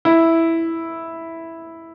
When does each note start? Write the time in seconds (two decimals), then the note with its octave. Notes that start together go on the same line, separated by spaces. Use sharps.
0.05 E4